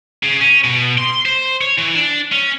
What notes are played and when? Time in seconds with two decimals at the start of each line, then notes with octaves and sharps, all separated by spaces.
0.23 C#3
0.41 C#4
0.64 B2
0.98 C6
1.26 C5
1.61 C#5
1.78 E3
1.95 D4
2.32 C#4